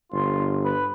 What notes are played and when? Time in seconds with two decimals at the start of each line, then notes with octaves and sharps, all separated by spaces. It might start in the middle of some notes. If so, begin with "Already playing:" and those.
0.12 G1 F4
0.65 B4